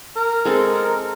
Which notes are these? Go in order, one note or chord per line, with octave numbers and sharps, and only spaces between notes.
A#4
G#3 C4 A4